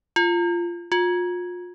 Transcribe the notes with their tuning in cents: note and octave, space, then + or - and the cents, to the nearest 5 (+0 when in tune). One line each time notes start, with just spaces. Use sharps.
F4 -15
F4 +35